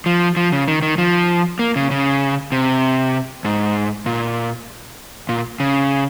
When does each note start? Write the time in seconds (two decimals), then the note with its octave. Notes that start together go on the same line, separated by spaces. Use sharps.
0.06 F3
0.37 F3
0.52 C#3
0.68 D#3
0.82 D#3
0.98 F3
1.59 A#3
1.76 C#3
1.91 C#3
2.52 C3
3.45 G#2
4.06 A#2
5.29 A#2
5.60 C#3